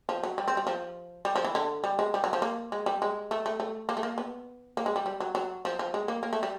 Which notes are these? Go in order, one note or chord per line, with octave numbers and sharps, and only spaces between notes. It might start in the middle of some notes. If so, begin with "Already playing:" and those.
F3
F#3
G3
C4
G3
F3
G3
F3
E3
D3
G3
G#3
G3
F#3
F3
A#3
G#3
G3
G#3
A3
A3
A3
A#3
A3
A#3
B3
A#3
G#3
G3
G3
F#3
F#3
F3
F3
G#3
A#3
A#3
A3
G3